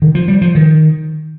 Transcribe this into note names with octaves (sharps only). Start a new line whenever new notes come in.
D#3
F3
G3
F3
D#3